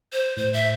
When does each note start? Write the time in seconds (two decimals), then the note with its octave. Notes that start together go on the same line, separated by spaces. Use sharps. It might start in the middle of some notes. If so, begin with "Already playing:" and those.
0.13 C5
0.37 A2 C5
0.53 E5